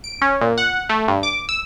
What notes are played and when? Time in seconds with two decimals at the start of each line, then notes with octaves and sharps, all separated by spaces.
0.04 D7
0.22 C#4
0.41 A#2
0.58 F#5
0.89 A3
1.08 G2
1.23 D6
1.49 E6